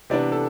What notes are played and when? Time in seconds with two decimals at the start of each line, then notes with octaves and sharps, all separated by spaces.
0.10 C3 E3 B3 D4 D5
0.32 A4